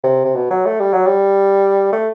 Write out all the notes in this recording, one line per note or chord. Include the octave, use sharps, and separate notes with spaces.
C3
C3
B2
F#3
A3
G3
F#3
G3
A3